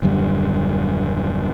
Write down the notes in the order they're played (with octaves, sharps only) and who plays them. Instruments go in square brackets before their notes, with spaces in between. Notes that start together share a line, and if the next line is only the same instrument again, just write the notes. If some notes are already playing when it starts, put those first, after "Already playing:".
[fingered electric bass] D#1 F#2 D3 G3